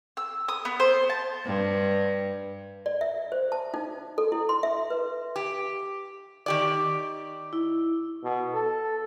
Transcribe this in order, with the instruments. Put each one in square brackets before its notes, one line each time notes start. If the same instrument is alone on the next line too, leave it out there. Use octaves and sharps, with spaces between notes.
[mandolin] E6
D#6
B3
C5
A5
[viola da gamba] G2
[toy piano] D5
E5
C5
A5
D#4
A4
E4
C6
E5
B4
[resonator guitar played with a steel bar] G4
D#3 G4 D5
[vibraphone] E4
[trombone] B2
A4